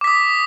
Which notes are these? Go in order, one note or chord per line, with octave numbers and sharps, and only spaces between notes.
D6 D#6 B6